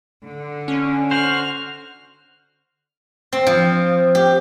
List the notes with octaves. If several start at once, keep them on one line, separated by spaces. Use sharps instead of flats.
D3
C#4
F#4 C5 F6
C4
F3
G4